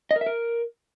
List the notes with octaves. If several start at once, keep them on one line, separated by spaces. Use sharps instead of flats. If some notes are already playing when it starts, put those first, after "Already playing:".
D#5
A#4
E5
A#4